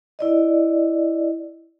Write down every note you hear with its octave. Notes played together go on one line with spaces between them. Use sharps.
E4 D5 D#5